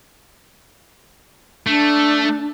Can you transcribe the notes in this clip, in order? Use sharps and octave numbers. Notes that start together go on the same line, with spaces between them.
A3 D4